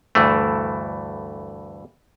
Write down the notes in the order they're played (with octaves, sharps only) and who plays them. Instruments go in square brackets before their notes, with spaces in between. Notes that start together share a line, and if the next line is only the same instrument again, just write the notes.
[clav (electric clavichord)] D2 G2 E3 A3